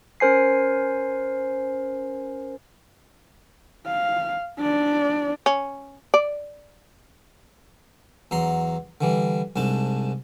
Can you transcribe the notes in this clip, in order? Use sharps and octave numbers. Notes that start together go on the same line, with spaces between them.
C#4 A#4 C5 G#5 C7
F5
D4 D5
C#4
D5
E2 F#3 A#5 C6
D3 E3 G3
C2 G#2 D4 A5